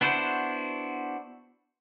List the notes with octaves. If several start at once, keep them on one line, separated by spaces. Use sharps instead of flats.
B3 D4 E4 F#4 C5